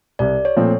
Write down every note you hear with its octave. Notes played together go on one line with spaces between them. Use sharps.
C2 D5
C#5
A#2 F3 A3 C4